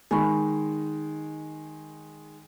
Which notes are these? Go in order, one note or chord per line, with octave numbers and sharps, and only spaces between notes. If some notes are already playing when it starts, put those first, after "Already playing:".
D#3 G#3 G#5 B5 C#6